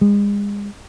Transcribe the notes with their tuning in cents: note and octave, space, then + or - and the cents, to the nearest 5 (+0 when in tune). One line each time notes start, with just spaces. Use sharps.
G#3 -35